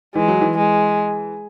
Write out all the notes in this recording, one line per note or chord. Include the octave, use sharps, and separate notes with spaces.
E3 G#3
F#3
E3
G#3